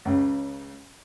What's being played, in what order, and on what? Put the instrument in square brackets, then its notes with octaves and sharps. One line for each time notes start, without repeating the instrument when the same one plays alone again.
[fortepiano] C#2 C#3